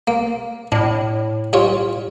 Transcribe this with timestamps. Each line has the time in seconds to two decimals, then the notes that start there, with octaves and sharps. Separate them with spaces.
0.07 A#3
0.72 A2 D4
1.53 G2 F4 C#5